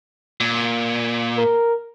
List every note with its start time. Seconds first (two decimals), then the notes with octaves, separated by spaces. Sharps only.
0.40 A#2
1.38 A#4